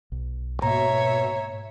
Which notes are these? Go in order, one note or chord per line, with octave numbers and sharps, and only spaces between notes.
B1
G#2 B2 A#3 C#5 E5 A#5